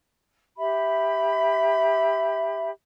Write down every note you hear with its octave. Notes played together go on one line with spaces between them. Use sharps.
G4 E5 B5